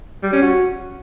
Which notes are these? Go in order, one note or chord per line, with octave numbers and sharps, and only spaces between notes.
G3
C#4
F#4